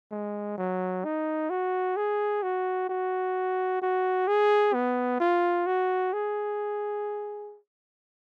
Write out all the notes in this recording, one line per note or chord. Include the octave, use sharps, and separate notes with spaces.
G#3
F#3
D#4
F#4
G#4
F#4
F#4
F#4
G#4
B3
F4
F#4
G#4